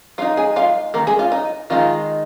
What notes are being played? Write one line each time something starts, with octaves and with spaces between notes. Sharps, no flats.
G#3 D#4 F4 F5
G#4 G#5
F4 F5
D#3 A#3 A#4
G#3 G#4
F4
D#4
D#3 G#3 D#4 F4